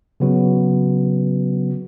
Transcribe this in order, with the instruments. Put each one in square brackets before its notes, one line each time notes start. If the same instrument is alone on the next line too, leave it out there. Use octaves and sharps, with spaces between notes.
[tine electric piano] C#3 F#3 B3 F#4